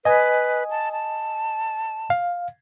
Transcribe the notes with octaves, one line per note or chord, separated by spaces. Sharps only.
B4 D#5 G#5 D#6
A5
A5
F5